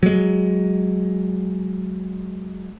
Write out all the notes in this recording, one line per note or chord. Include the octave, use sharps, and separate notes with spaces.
F#3 G#3